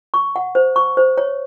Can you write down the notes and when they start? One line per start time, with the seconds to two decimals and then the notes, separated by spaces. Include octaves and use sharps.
0.14 C#6
0.36 F#5
0.55 C5
0.76 C#6
0.97 C5
1.18 C#5